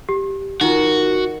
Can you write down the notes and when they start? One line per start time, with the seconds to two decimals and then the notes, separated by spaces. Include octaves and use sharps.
0.09 G4
0.61 D#3 D#4 F4 F#4